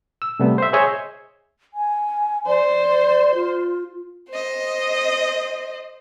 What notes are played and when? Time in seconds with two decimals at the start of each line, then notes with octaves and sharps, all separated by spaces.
0.22 E6
0.40 C3 G3 A3 B3
0.58 C5 E5
0.73 G#4 C5 C#5 D#5 E5 G#5
1.74 G#5
2.47 C5 D5
3.35 F4
4.30 C5 D#5